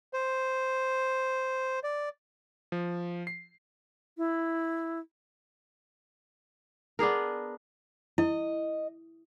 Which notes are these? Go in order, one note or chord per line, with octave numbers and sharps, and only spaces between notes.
C5
D5
F3
C7
E4
B3 D4 G#4 A#4
E4 D#5